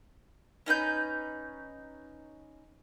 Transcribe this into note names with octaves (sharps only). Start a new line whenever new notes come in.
C#4 D#4 B4 G6